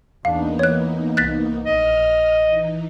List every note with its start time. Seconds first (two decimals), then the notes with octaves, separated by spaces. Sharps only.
0.25 E2 A#3 B3 D4 D#4 F5
0.59 E3 C#5 F#6
1.17 C2 F#6 A6 B6
1.66 A#1 D#5 F6
2.46 E3 D#4